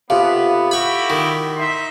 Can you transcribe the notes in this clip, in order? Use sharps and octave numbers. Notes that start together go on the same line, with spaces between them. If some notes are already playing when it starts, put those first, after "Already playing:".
C3 B3 F4 A4 F5
E4 F#4 G4 B5 C#6
D#3
D#4 E5 C6